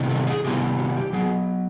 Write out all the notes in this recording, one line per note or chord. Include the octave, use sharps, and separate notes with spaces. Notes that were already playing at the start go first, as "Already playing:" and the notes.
Already playing: C3 D#3 G3 B3 E4
A4
G#4
C3 D#3 G3 B3 E4 G4
F#4
G4
F#3 B3 G#4